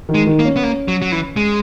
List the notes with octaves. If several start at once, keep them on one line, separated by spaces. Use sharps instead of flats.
D#3
G#3
D#3
A#3
C#4
B3
A#3
F#3
F#3
E3
G#3